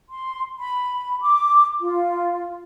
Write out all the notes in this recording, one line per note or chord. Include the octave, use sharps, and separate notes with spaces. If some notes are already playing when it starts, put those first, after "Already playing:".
C6
B5
D6
F4